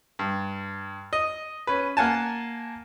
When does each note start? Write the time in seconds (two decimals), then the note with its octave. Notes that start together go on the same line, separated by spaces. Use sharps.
0.19 G2
1.13 D#5
1.67 C#4 B4
1.97 A#3 F5 F#5 G#5 A5